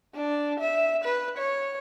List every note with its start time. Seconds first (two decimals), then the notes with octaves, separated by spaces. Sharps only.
0.15 D4
0.60 E5
1.04 B4
1.38 C#5